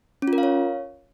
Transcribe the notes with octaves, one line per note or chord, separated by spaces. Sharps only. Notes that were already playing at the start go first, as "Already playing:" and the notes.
C#4
F4
A#4
F5
C#5